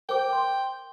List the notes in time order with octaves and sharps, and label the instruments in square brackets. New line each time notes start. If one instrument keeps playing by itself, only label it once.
[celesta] A#4 C5 D6 [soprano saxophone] G5
[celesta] C6